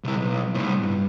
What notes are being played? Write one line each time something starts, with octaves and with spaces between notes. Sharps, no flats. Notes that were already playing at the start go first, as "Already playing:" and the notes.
C2 E4
B1
C2 A2
G2